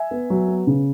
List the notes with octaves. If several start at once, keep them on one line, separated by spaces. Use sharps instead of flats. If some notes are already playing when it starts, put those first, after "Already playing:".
Already playing: E5 G#5
B3
F#3
B3
C#3